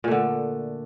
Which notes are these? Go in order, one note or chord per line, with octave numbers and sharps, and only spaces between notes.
A#2 D3 A3